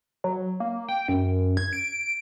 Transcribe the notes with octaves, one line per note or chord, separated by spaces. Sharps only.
F#3
A#3
G5
F#2
G#6
D7